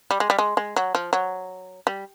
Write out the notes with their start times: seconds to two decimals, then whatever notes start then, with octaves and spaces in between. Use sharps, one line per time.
0.11 G3
0.20 G#3
0.30 G3
0.39 G#3
0.57 G#3
0.76 F#3
0.95 F3
1.13 F#3
1.87 G3